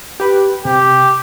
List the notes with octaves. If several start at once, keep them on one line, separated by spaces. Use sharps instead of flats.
G4 B4
C3 G4